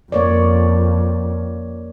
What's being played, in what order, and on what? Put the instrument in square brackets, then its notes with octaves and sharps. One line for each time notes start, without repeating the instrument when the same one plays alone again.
[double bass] F2 [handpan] A#3 C#5 D5